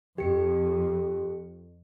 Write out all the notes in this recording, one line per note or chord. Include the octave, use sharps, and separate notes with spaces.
F2 G4 C#7